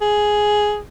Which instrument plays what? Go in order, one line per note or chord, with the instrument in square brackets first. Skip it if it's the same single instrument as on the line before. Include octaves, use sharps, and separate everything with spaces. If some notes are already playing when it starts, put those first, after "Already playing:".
[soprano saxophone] G#4